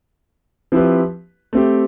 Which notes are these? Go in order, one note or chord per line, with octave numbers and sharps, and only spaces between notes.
F3 C4 E4 G4 B4
A3 C4 G4